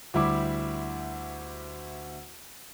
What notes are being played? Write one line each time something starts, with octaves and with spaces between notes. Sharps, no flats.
D2 G3 E4 D6